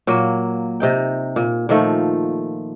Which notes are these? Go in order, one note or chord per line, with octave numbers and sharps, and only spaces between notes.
A#2 F#3 A#3
C3 D#4 G5
A#2
A#2 D#3 F3 A3